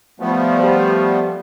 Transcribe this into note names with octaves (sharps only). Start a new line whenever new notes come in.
F3 G3 A3 B3
G4 C5